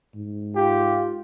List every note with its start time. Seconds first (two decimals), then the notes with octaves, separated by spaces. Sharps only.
0.15 G#2
0.56 F4 G4